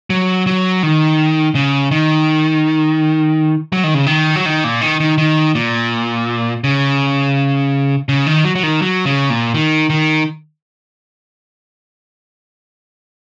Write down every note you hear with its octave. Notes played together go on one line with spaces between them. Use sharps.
F#3
F#3
D#3
C#3
D#3
F#3
D#3
C#3
D#3
F#3
D#3
A#2
D#3
D#3
D#3
A#2
C#3
C#3
D#3
F#3
F#3
D#3
F#3
C#3
A#2
D#3
D#3